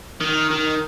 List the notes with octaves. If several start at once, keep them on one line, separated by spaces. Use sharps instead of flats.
D#3
D#3